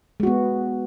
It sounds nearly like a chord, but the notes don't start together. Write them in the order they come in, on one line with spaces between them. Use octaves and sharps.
G#3 F#4 B3